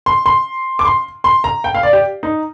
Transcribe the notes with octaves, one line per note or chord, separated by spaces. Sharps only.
C6
C6
D6
C6
C6
A#5
G5
F5
D5
G4
D#4